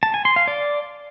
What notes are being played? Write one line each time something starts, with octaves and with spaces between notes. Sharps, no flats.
A5
G#5
C6
F5
D5